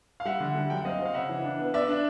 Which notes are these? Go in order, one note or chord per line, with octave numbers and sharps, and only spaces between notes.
F5
G3 E5 F#5
D3
G3
F#2 G5
F#5
C4 D#5 F5
C4
F5
C#3 E5 F#5
E3
D4
B3
B3 D5 E5
D4